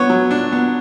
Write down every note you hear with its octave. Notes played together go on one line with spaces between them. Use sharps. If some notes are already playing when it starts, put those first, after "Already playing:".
Already playing: B3 C#5
F#3
D4
B3